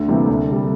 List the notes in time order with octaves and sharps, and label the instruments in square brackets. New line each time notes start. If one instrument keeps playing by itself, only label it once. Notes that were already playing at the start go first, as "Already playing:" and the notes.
Already playing: [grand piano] D2 [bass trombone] D3
[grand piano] C3 E3 G3 A#3
C2
C3 G3